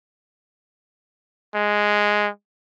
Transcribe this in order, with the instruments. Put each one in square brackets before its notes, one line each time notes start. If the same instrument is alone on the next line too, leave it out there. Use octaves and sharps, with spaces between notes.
[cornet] G#3